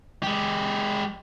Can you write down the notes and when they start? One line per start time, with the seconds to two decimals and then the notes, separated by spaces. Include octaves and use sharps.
0.23 G#3 G4